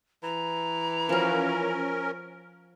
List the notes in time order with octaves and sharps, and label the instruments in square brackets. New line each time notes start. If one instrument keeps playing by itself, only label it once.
[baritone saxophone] E3 [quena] A#5
[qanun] F3 F#4 [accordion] C#4 A#4